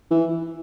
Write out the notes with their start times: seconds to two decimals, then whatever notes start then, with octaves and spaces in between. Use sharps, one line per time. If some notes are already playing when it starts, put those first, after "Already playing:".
0.11 E3